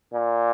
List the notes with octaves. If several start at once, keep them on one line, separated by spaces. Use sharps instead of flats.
A#2